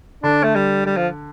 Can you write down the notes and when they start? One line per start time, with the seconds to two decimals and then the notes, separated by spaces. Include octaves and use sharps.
0.23 D3 D4
0.43 A3
0.55 G3
0.86 G3
0.97 F3